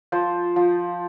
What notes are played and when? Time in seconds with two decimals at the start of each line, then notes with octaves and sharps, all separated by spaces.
0.12 F3 C5
0.56 F3